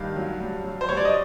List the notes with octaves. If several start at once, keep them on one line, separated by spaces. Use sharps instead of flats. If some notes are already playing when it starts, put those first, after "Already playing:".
Already playing: G2 D#3 F5
F#3
G2
F#3
C5
G2 C#5
D5
D#5